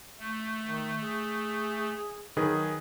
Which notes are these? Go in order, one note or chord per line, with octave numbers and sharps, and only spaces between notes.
A3
D#3
G#4
D#3 F#3 G#4 B4